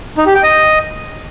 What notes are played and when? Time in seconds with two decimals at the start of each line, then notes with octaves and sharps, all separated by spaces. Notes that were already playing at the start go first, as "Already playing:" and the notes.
0.18 D#4
0.26 G4
0.35 G5
0.43 D#5